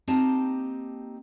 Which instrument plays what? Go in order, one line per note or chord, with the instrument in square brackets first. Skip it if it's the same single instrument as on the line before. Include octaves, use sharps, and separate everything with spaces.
[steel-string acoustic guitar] A#3 C4 D#4 G4 A5 A#5